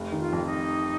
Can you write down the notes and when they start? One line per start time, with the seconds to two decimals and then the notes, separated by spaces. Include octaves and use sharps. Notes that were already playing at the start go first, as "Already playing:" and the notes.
Already playing: F1
0.12 D#3
0.19 F4
0.32 F2
0.46 D#4